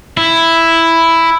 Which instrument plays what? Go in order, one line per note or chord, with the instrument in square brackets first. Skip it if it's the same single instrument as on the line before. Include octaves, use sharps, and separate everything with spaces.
[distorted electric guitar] E4